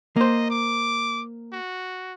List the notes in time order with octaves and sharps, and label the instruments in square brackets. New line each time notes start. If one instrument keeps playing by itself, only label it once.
[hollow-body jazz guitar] A#3 C5 [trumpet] D#5
[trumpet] D6
F#4